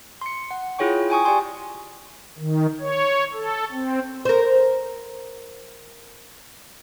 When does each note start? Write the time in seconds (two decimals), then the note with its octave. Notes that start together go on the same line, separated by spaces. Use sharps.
0.21 C6 C#7
0.51 F#5
0.79 E4 F4 G#4 C#5 G5 C#6
1.10 G5 G#5 C#6 D#6
1.25 G4 D5 G5 G#5 C6
2.38 D#3
2.81 C#5
3.33 A4
3.72 C4
4.25 A#4 C5